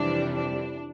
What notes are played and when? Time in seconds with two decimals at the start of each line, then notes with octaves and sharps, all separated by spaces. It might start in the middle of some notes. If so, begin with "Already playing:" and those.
Already playing: F2 C3 E3 G3 D4
0.35 D4